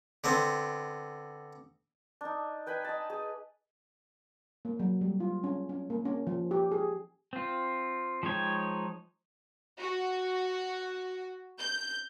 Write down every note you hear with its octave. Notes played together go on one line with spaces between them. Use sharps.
D3 B3 C4
D4 D#4
B4 G5 G#5 B5
D#5 A5
G#4
A#3
F#3
G3
F4
C#4
C#4
A#3
C#4
F3
G4
G#4
C4 F4
F3 G#3 D#4 C#5 G5
F#4
G6